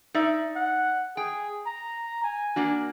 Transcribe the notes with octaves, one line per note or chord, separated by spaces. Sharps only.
D#4 D5 E5
F#5
G#4 G5
A#5
G#5
A#3 D4 F#4